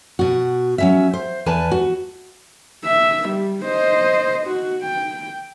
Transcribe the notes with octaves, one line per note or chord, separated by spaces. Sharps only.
B2 F#4
F#3 C#4 E5
C5
E2 B4 G#5 A5
F#4
E5
G3
C5 D#5
F#4
G5